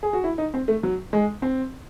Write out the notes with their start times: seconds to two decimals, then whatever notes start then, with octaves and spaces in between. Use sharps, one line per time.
0.03 G#4
0.13 F#4
0.24 E4
0.38 D#4
0.54 C4
0.68 A3
0.83 F#3
1.13 G#3
1.42 C4